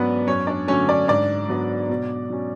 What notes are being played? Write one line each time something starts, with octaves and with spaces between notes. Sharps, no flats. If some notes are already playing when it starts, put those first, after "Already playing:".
Already playing: G#2 F#3 B3 C#4 D4 B4 D5
F#2 C#4 C#5
D4 D5
D3 F#3 A3 C#4 C#5
D4 D5
G#2 D4 D5
F#3 B3 D4
B2
F#3 C#4